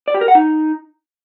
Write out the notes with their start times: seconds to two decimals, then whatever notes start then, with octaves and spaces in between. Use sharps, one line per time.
0.08 D5
0.14 G4
0.21 A#4
0.28 F#5
0.35 D#4